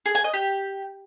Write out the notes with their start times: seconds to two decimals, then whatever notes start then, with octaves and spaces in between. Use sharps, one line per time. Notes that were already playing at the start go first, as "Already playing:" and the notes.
0.06 G#4
0.15 G#5
0.24 D#5
0.34 G4